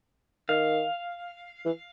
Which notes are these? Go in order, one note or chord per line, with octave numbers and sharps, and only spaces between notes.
D#3 F5
E3